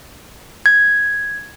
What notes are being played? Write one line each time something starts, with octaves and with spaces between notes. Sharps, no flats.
G#6